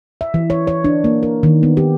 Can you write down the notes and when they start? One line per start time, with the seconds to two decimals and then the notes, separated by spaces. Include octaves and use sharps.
0.21 E5
0.34 E3
0.50 C#5
0.67 C#5
0.84 D4
1.04 A#3
1.23 A#4
1.43 D#3
1.63 B3
1.77 G4